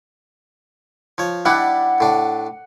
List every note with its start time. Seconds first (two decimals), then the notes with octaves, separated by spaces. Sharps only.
1.18 F3 C#5
1.45 G3 D4 E4 F#5
2.00 A2 D4